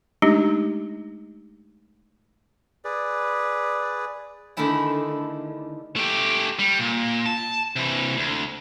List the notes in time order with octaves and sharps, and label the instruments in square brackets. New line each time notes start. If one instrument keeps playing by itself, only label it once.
[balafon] G#3 A3 D4 D#4 G4
[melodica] G#4 B4 D5
[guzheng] D3 D#3 A3 D4 E4 G#4
[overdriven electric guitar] A3 G4
G3
A#2
A5
C3 E3
D2